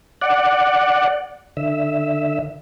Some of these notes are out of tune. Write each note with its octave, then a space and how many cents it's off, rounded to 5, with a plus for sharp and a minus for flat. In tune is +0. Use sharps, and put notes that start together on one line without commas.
D5 +10 F#5 +0
D3 +20 E5 +0